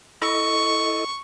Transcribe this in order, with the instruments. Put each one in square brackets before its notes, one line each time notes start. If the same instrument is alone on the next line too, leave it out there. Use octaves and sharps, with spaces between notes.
[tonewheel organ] E4 A4 D#5 [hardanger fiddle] C#6